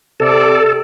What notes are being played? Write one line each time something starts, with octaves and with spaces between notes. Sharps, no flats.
C3 A4 D5